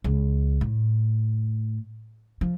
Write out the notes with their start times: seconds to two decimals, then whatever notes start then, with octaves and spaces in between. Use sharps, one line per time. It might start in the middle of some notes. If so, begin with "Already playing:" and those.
0.04 C#2
0.61 A2
2.41 F3